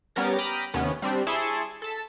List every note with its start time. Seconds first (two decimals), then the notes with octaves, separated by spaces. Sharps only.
0.16 G3 B3 C#4 A#4 A6
0.38 G5 A#5 B5 D6 D#6 F6
0.74 D#2 C3 B3 C#4
1.02 G3 C4 D4
1.27 E4 G#4 E5 A5 C6 C#6
1.82 A4 A5 B6